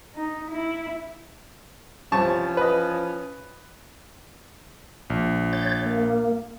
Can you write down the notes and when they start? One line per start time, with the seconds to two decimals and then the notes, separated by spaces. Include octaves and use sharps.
0.15 D#4
0.51 E4
2.12 C2 E3 F3 C#4 A5 C#6
2.57 B4 D#5
5.10 A#1
5.53 C#5 G6 A6
5.86 A#3